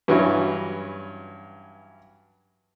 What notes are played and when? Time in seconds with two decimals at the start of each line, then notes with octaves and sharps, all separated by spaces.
0.08 G2 E3 F#3 C#4 E4